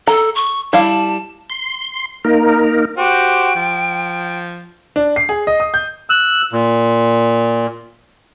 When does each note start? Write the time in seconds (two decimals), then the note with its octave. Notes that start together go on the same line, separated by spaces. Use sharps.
0.07 A4 A#5
0.35 C#6
0.73 G3 E4 F5 A5
1.50 C6
2.25 A#3 D#4 A#4
2.97 F#4 G4 C5 G5
3.56 F3
4.96 D4
5.16 C7
5.29 G#4
5.47 D#5
5.60 D#6
5.74 G6
6.10 E6 F#6
6.53 A#2